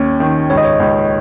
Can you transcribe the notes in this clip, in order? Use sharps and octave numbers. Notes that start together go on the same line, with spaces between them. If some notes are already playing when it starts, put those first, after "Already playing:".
Already playing: D#2 C#4
D#3
C#2 C#5
D#5
C#5
C#2